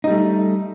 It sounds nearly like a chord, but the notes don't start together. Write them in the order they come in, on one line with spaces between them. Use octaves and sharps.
D#4 G3 A3